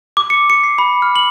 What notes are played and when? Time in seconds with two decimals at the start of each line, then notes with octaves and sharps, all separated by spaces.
0.17 D6
0.30 C#7
0.50 C#7
0.64 C7
0.78 B5
1.02 F6
1.16 F#7